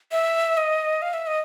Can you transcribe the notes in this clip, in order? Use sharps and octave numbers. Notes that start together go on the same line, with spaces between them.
E5
D#5
F5
E5
D#5